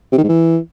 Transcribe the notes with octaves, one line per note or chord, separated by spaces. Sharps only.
C3
D#3
G#2
E3